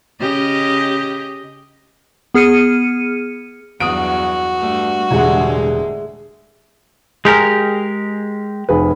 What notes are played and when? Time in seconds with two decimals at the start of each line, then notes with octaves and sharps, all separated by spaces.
0.20 C#3 G4 D#5
2.34 B3 G#4 F6 C#7 D#7
3.80 E2 G2 F#3 F#4 D#6 D7
4.57 G2 G3 A3
5.11 E1 A2 D3 G3 G#3 G#4 E5 F#5
7.25 G#3 G4 G#4 A#4 F7
8.69 F1 G#4 B4